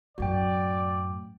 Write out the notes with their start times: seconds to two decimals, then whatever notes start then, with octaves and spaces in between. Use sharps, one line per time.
0.18 F#2 A2 F#4 D5 G5